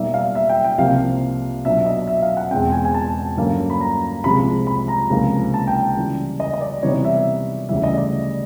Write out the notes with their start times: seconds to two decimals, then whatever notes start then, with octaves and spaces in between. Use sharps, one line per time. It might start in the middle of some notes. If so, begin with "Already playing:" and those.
Already playing: B2 G3 A#3 D#4 E5
0.14 F5
0.35 E5
0.49 G5
0.64 G5
0.78 C2 C3 F3 A#3 F5
1.65 B2 F#3 B3 D4 E5
1.86 D#5
2.07 E5
2.22 F5
2.37 F#5
2.51 E2 B2 G#3 C4 G5
2.72 G#5
2.85 G#5
2.94 A5
3.37 G2 D3 F#3 A#3 C#4
3.70 B5
3.81 A#5
4.24 C2 C3 F3 G#3 B5
4.67 B5
4.88 A#5
5.10 C#2 C3 F3 A#3 D#4
5.54 A5
5.67 G5
5.97 C#3 E3 G3
6.40 D#5
6.53 D#5
6.61 D5
6.83 C3 E3 G3 B3 D#4 C#5
7.05 E5
7.69 D2 C#3 E3 G3 E5
7.83 D#5
7.97 D5